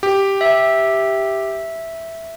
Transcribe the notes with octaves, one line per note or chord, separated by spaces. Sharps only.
G4
E5